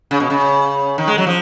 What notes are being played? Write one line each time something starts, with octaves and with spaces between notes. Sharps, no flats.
C#3
B2
C#3
D#3
G#3
F#3
F3